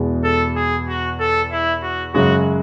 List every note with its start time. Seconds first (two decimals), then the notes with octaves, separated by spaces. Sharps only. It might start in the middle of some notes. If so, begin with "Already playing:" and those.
Already playing: E2 B2 G#3
0.24 A4
0.56 G#4
0.88 F#4
1.20 A4
1.52 E4
1.82 F#4
2.14 F#2 C#3 G#3 F#4